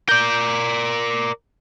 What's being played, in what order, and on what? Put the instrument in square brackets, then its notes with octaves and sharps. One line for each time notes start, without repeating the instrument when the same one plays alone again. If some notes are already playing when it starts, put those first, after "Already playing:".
[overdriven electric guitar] A#4 D5 [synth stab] G6